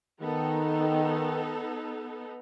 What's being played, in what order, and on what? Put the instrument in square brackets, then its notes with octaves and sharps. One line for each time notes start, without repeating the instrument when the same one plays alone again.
[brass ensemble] D#3 [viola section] B3 D#4 A4